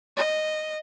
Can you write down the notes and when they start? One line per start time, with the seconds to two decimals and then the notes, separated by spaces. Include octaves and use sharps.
0.17 D#5